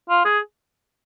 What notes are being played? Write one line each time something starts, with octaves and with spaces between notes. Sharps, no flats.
F4
G#4